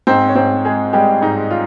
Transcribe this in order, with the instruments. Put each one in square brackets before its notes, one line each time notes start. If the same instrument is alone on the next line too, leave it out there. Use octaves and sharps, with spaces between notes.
[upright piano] G#2 C4 C5
C#5
G#2 C4 C5
G#3 G#4
G3 G#3 G4
G#2 D#4
F4